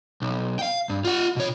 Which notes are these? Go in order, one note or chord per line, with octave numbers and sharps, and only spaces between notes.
B1
F5 G5
G2
F4 F#5
B2 C#5